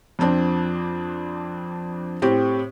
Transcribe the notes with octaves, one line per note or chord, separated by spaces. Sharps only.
F2 F3 C4 D4
A2 C4 G4